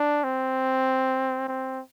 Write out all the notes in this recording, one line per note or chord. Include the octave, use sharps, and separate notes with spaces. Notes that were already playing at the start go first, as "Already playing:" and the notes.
Already playing: D4
C4
C4